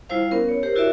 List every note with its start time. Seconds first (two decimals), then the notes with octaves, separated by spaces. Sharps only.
0.09 G3 E4 F4 C5 F5
0.31 B3 C#4 A#4
0.49 C#5
0.63 G4 A#4 C5
0.76 E4 F#4 A#4 C#5 D5 E5